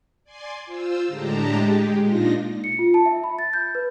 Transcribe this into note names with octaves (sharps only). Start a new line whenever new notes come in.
D5 G#5 C6
F4 C5 E6
A2 D3 G#3 G4 A5 A#5
G#3 G4
A#2 D4 D#4 F4 A#6
C#7
F4
A5
E5
B5
A6
G6
B4